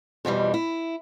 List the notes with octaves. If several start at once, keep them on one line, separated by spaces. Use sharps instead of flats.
F2 B2 E3 G3
E4